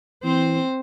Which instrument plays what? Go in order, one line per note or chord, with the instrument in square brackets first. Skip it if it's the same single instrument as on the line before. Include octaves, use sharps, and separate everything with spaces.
[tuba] E3 [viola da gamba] C4 C5